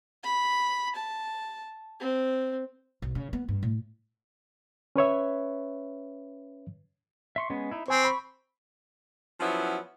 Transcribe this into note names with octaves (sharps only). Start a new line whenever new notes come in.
B5
A5
C4
B1
C#3
B3
G2
A2
C#4 B4 C#5 E5
E5 C6 C#6
G#3 B3 C#4
D#4 E4
C4 C5 G#5 C#6
B5
F3 F#3 B3 C#4 E4